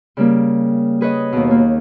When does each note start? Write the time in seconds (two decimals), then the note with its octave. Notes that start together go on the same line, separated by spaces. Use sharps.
0.17 C#3 G3 A#3
1.01 G#4 B4 C#5 D#5
1.33 D#2 B2
1.51 A#3